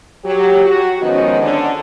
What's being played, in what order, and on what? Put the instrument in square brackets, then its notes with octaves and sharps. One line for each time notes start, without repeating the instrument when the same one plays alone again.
[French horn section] F#3 G4
F#4
D#3 F3 G#3 B3 C#4 D#4
D3 C#4